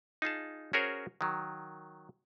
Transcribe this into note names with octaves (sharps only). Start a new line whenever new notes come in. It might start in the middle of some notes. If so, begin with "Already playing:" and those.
D#4 F4 G#4 A5
C#4 F#4 G#4 A#4 C5 C#5
D#3 F#3